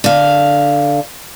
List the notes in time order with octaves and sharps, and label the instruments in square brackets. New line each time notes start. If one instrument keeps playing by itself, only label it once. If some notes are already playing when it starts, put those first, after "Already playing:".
[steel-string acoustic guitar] D3 F5